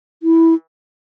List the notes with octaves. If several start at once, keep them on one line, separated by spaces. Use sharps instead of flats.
E4